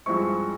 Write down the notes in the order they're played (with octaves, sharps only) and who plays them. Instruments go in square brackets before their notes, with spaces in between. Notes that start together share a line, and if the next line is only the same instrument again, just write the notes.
[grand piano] G2 F3 G#3 C4 E4 C#6